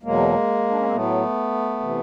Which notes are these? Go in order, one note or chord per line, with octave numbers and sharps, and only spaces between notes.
E2 B2 F#3 G#3 A#3
D4
C#4
C4
A2 F#3 A3 B3
C3 E3